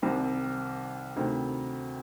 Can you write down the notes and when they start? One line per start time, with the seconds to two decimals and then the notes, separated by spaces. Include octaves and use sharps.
0.02 C2 C3 D#3 G3
1.16 D2 C3 D#3